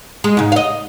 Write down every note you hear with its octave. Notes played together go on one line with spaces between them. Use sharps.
G#3
G#2 C#3
D#5 F5